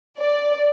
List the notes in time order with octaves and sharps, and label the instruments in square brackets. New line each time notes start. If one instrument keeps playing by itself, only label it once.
[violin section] D5